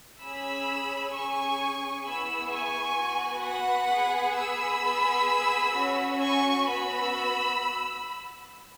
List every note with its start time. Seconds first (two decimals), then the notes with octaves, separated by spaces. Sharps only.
0.20 C#4 G#4 B5 E6
1.13 C#4 G#4 G#5 C#6
2.04 B3 E4 G#4 B5 E6
2.51 G#5 C#6
2.98 B3 F#4
3.43 F#5 B5
3.90 B3 G#4
4.36 B5 E6
4.81 B3 G#4
5.74 C#4 F#4
6.20 G#5 C#6
6.66 B3 F#4 B5 E6